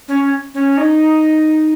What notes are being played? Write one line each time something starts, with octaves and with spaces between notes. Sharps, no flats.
C#4
C#4
D#4